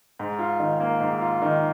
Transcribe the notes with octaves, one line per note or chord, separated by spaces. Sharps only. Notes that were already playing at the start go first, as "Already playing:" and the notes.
G#2
F4
D#3
A#3
G#2
F4
D#3